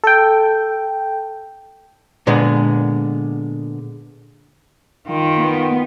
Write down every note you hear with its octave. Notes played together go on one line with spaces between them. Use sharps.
A4 G5
A#2 D3 G#3 B3
D#3 F4 G5
B3